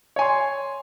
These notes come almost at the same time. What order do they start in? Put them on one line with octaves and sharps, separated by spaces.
C#5 G#5 C6